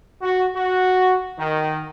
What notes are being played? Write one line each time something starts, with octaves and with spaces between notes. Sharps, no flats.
F#4
F#4
D#3